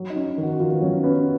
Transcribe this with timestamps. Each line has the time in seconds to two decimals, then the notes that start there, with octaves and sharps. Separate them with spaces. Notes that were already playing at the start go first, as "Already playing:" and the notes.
Already playing: F#3
0.10 D#4
0.16 C#4
0.38 D#3
0.43 F#4
0.60 D#3 F4
0.71 B3
0.81 F#3 C#4
1.04 B3 C#4